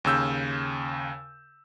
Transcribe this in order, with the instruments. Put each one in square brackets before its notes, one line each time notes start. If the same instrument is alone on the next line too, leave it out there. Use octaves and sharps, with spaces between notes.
[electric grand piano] D#2 C#3 E6 G6